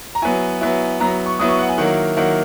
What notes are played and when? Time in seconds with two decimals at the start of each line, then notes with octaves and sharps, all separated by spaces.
0.15 A#5
0.22 F#3 B3 E4 G#5
0.61 F#3 B3 E4
1.00 F#3 B3 E4 A#5
1.26 C#6
1.39 F#3 B3 E4 D#6
1.48 C#6
1.59 F#5
1.69 G#5
1.78 D#3 F#3 A#3 E4 F#5
2.17 D#3 F#3 A#3 E4 F#5